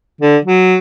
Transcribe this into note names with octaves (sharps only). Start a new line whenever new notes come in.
D3
F#3